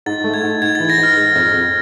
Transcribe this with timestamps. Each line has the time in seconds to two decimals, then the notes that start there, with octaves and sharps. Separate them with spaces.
0.06 G#2 A6
0.24 A3
0.34 G#6
0.43 G#2
0.62 G#2 G#6
0.75 E3 A6
0.90 A#6
0.98 G#2
1.03 F6
1.17 G#3
1.35 F2
1.54 F2